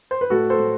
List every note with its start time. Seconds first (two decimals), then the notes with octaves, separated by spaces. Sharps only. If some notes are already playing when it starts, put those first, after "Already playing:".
0.11 C5
0.21 B4
0.30 A2 F#4 A4
0.50 A4 C5
0.60 A2